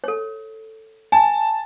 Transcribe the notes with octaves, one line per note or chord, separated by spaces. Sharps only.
A4 C#5
G#5 A5